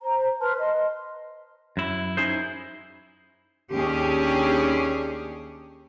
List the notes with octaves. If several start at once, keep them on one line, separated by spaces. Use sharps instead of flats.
C5 A#5
B4 A5 C6 F6
D#5 C6
F#2 E4
C#4 D#4 E4 G#4 C5
D#2 C#4 D4 G4 G#4